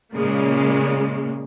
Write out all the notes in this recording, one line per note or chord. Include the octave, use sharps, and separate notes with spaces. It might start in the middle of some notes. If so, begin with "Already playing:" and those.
A#2 C#3 G#3 A#3